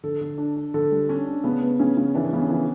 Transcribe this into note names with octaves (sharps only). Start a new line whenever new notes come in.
D3 A4
D3
D4
D4
D3 A4
G3
C#4 D4
D4
C#3 B3
B3
C#3 C#4
C#3
E3 D4
C#4
C#3 B3
C#4
E3